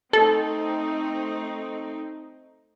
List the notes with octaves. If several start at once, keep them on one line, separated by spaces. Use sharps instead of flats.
A3 C4 D#4 A4